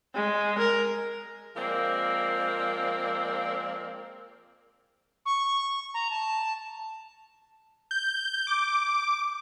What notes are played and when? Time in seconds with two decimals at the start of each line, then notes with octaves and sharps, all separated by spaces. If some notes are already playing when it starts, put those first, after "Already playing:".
0.14 G#3
0.59 A#4
1.56 F3 G#3 A#3 C4 A#4 D5
5.26 C#6
5.94 A#5
6.10 A5
7.91 G6
8.47 D6